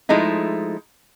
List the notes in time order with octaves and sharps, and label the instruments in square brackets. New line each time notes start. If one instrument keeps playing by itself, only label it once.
[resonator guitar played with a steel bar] F3 G#3 A3 D#4 E4